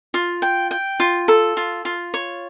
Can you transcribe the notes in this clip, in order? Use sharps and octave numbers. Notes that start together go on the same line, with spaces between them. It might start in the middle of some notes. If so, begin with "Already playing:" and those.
F4
G5
G5
F4
A4
F4
F4
C#5